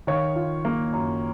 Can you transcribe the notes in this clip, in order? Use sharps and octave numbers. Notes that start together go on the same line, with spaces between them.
D#3 C#5 F5
F4
A#3
F#2